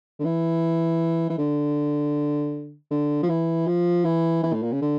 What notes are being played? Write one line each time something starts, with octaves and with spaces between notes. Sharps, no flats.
D3
E3
E3
D3
D3
F3
E3
F3
E3
E3
A2
A#2
C#3
D3